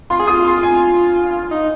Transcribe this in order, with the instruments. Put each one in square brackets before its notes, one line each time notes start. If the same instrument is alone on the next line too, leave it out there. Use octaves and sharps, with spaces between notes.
[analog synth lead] F4 [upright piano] C6
[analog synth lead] G#4
[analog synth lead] F4 [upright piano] D#6
[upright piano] C6
G#5
[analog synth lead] D#4